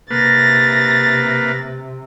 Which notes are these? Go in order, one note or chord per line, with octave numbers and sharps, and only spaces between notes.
C3 A#3 B4 A6 A#6